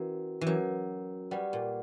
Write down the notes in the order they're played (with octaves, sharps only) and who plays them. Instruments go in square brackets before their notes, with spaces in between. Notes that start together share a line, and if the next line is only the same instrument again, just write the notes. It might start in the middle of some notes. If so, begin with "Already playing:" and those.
Already playing: [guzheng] E3 [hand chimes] C#4 F#4 A#4
[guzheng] E3
[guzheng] F#3 [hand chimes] C#4 F#4 A#4
[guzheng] G3 [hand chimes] G4 B4 D5 F#5
[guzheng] A#2